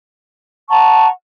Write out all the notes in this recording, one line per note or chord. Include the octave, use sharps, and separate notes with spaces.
F#5 A5 A#5 C#6